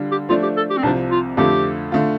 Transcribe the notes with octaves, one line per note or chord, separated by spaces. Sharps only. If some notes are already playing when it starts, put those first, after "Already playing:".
Already playing: D3 G3 D4 F4
G4
F3 A3 D4 F4
G4
A4
G4
C4
C2 C3 F3 D4
F4
F2 D3 A3 F4 G4 A4
D3 A3 F4